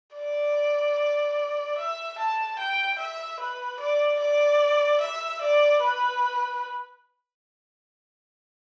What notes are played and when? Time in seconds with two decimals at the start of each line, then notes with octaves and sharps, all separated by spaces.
0.16 D5
1.78 E5
2.19 A5
2.59 G5
2.98 E5
3.40 B4
3.80 D5
4.20 D5
5.01 E5
5.41 D5
5.82 B4